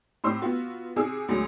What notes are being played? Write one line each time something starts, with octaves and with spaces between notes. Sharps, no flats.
A2 C4 G4 C5 C6 E6
B3 F4 F#4
C3 G#4 G#5 E6
D2 F#3 G#3